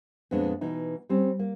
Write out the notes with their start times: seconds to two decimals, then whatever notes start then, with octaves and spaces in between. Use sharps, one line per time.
0.31 F2 A#2 G#3 B3 D4
0.61 B2 E3 D#4
1.09 G3 C4 C#4
1.39 A#3